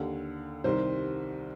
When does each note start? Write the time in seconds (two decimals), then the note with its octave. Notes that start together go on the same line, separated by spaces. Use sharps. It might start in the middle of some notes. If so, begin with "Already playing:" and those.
Already playing: D#2 D3
0.64 C2 C3 D#3 C5